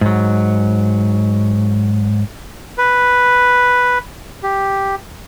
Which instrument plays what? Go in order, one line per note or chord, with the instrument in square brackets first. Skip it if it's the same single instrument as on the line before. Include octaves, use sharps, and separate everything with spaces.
[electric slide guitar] G#2 F#3
[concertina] B4
G4